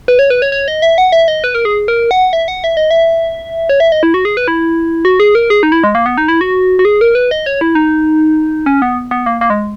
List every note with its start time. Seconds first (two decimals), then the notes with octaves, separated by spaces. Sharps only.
0.08 B4
0.19 C#5
0.30 B4
0.42 C#5
0.52 C#5
0.68 D#5
0.82 E5
0.98 F#5
1.12 E5
1.28 D#5
1.44 B4
1.55 A#4
1.65 G#4
1.88 A#4
2.11 F#5
2.33 E5
2.48 F#5
2.64 E5
2.77 D#5
2.91 E5
3.69 C#5
3.80 E5
3.92 D#5
4.03 E4
4.14 F#4
4.25 G#4
4.37 B4
4.48 E4
5.05 F#4
5.20 G#4
5.35 A#4
5.50 G#4
5.63 D#4
5.72 E4
5.84 G#3
5.95 A#3
6.06 B3
6.18 D#4
6.28 E4
6.41 F#4
6.79 F#4
6.85 G#4
7.01 A#4
7.15 B4
7.31 D#5
7.46 C#5
7.61 E4
7.75 D#4
8.66 C#4
8.82 B3
9.11 B3
9.26 A#3
9.41 A#3
9.50 G#3